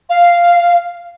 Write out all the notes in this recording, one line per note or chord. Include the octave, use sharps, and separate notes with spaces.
F5